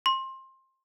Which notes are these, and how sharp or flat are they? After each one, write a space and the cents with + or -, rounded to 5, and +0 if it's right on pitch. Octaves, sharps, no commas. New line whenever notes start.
C6 +20